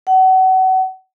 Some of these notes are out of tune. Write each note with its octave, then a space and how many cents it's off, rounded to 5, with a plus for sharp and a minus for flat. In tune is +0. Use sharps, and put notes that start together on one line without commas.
F#5 +30